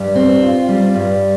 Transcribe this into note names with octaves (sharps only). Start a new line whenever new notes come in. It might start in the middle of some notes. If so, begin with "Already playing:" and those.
Already playing: G2 G3
C4
F4
G3
G2